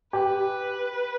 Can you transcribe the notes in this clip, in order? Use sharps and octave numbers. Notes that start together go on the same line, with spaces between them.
G4 B4